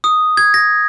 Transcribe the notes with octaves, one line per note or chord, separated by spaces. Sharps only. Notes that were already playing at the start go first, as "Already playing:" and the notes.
D#6
G#6
A#6